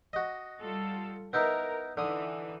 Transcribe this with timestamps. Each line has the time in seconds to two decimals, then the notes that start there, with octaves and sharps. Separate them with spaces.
0.13 F#4 D#5
0.61 G3 F4 A4
1.33 B3 D#4 E4 A#4
1.97 D3 E3 D#4 D#6